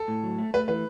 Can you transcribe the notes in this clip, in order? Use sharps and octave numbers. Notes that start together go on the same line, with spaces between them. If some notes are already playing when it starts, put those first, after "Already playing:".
Already playing: A4
A2
F#3
A3
A3 B4
E3 B4